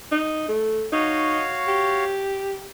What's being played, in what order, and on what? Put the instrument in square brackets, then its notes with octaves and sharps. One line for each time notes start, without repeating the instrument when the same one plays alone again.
[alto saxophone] D#4
A3
[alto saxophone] D#4 [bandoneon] F#4 C#5 F5
[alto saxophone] G4